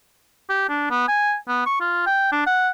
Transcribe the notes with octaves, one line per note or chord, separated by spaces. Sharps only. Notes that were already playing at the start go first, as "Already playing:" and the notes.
G4
D4
B3
G#5
B3
C#6
F4
G5
D4
F#5